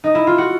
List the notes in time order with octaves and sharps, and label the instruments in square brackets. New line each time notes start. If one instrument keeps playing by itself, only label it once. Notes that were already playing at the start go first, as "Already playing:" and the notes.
[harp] D#4
E4
F4
F#4